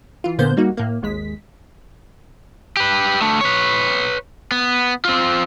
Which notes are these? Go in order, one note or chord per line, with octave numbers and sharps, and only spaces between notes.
E3 F4
A#2 D3 A#3 B3 C5 G6
G3 A#3 D#4 F#4
A2 A#3
G#1 D#2 G#3 B6
G4 B4
D3 A3
B4 C#5
B3
C4 F4